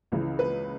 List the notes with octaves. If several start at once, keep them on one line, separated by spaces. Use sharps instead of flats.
C#2 C#3 E3
B4